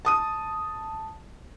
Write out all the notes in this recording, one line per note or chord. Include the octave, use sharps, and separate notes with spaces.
A5 D#6 D#7